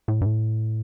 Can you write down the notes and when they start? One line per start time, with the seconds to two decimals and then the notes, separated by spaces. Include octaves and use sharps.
0.08 A2
0.21 G2
0.26 A2